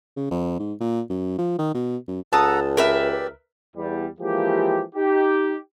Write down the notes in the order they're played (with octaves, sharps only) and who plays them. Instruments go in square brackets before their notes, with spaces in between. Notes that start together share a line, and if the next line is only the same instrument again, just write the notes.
[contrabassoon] C#3
F2
G#2
A#2
F#2
F3
D#3
B2
F#2
[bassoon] C#2 [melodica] A4 F#5 A#5 [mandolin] A5 D#6
[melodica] G4 D5 [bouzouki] A#4 B4 E5
[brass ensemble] E2 G3
E3 F3 G#3 A#3 G4
D#4 G4